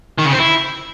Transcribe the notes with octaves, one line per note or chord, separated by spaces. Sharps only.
D#3
C#3
C4
E4